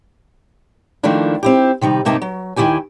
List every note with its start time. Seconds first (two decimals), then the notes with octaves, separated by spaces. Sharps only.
1.03 D#3 F3 A3 A#3 D4 E4
1.43 C4 E4 G4
1.81 C3 D#3 G3 D#4
2.05 G2 C3 A#3 D#4 E5 A5
2.22 F#3
2.56 D#2 D#3 F3 E4 G4 G#5